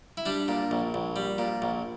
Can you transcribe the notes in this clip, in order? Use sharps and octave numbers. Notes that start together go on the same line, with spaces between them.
E4
G3 D4
A#2
A#1
A#1
G3
A#2
A#1